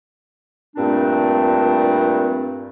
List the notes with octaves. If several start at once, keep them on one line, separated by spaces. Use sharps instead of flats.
G2 A#2 A3 C4 D4